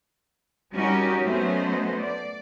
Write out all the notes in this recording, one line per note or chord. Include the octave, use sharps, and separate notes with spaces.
G3 C#4 D#4 F#4 G4 A#4
F#3 A3 B3 C#4 C5 D#5
D5